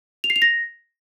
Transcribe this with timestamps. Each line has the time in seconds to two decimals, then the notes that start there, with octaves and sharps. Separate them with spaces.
0.24 F7
0.30 C7
0.36 F7
0.42 A#6